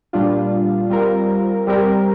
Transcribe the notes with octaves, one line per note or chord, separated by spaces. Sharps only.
A#2 G3 D4 F4
G3 C4 F4 A#4
G3 C4 G4 A#4